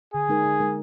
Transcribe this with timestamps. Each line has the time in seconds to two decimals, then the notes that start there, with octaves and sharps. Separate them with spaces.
0.14 D3 G#4
0.29 G#3 D#4 A#4
0.45 D3
0.60 G#3 D#4 A#4